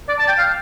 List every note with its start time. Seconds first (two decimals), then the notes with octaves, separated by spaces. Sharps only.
0.08 D5
0.19 A5
0.28 G5
0.38 F5